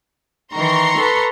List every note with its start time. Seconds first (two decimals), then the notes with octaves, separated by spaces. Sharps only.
0.53 D#3 E3 A#5 C6 C#6
0.98 A4 B4